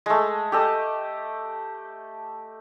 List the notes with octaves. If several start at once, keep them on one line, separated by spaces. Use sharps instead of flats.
G#3 A3
G4 A4 D#5